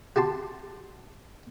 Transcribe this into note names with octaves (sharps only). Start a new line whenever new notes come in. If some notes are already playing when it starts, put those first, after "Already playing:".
F#4 G4 A5 C6